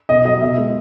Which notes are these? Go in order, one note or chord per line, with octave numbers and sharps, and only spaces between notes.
B2 D#5
F#3 D#5
B2 E5
G#3